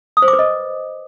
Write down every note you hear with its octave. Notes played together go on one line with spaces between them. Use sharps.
D#6
C5
D6
B4
D#5